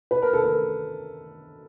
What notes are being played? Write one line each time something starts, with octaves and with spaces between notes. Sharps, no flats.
B4
A#4
A4
A#4